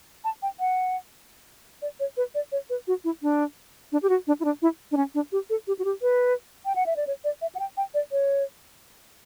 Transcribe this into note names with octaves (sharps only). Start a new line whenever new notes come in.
A5
G5
F#5
D5
C#5
B4
D5
C#5
B4
F#4
E4
D4
D4
G4
F#4
D4
E4
D4
E4
D4
C#4
D4
G4
A4
G4
F#4
G4
B4
G5
F#5
E5
D5
C#5
D5
E5
F#5
G5
G5
D5
C#5